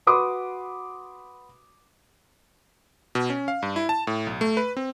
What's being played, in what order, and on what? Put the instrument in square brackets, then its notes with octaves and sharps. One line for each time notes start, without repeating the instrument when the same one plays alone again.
[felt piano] F#4 B4 B5 C6 D6 D#6
[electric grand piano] B2
C#4
F5
G2
E4
A5
A2
B1
A3
B4
C4